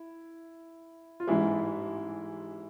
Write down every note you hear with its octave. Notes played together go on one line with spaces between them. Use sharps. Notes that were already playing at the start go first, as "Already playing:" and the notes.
Already playing: E4
F4
A1 G#2 E3 G#3 E4